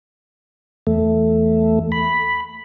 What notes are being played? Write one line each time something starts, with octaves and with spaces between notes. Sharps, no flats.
E2 A3
B5